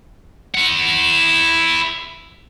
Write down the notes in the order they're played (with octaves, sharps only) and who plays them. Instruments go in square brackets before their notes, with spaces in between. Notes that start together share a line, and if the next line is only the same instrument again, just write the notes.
[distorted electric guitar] E4 F#5